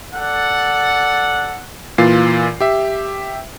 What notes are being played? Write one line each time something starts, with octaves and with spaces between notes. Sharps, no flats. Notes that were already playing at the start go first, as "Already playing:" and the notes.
A4 D5 F#5
A#2 E3 F4 C7
G4 E5